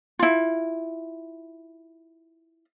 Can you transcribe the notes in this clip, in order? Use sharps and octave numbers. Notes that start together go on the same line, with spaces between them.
E4 F4